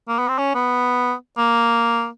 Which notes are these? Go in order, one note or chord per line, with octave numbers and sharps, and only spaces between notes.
A#3
B3
C4
C#4
B3
A#3